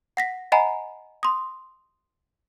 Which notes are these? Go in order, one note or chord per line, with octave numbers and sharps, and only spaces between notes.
F#5 A#6 B6
D#5 F#5 G#5 A#5 B5
C6 D#6